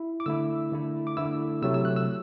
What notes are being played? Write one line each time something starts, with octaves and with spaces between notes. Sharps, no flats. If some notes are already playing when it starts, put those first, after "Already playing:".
Already playing: E4
D6
D3 A3 E4 E6
D3 A3 E4
D6
D3 A3 E4 E6
C3 F#3 A3 E6
E6
F#6
E6